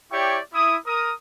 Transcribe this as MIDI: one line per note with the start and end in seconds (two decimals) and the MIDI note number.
0.12 0.39 64
0.12 0.39 67
0.12 0.39 73
0.12 0.39 74
0.12 0.39 79
0.12 0.39 85
0.54 0.77 64
0.54 0.77 87
0.86 1.12 70
0.86 1.12 87